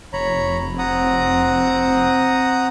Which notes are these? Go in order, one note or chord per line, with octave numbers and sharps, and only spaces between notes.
F1 C#5 A#5 B5
C4 F#5 A#5 D#6